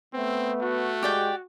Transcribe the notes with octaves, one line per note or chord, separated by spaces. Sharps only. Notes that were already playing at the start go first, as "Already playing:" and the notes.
A3 B3 C4
A3 F#4
G#3 G4 D5 G5